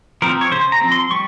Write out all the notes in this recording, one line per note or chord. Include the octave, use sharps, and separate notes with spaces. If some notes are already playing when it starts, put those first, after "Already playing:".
F3 C4 A#4
C#5
C#3 C5
A#5
F3 C4
C6
G3 C#6